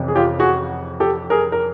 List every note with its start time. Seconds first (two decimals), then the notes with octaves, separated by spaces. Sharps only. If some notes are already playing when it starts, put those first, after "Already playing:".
Already playing: F2 C3 E3 C#4
0.08 G#4
0.16 F4 G4
0.39 F#4 G#4
1.00 G4 A4
1.30 G#4 A#4
1.52 A#4